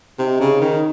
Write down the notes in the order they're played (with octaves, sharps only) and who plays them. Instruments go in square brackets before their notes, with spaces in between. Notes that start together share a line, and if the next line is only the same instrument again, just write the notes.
[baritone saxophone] C3 [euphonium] D#4
[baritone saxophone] C#3
D#3